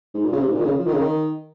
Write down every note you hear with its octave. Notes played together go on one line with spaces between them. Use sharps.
G#2
A#2
C#3
C3
G#2
A#2
D#3
C#3
F3
D#3
C#3
D#3